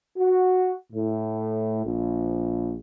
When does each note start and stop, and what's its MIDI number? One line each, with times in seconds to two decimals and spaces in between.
0.17 0.72 66
0.93 1.83 45
1.84 2.75 34